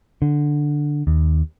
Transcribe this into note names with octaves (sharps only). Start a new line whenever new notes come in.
D3
D#2